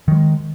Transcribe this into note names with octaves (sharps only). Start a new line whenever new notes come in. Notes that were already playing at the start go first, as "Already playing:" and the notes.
D#3 F#3 G#3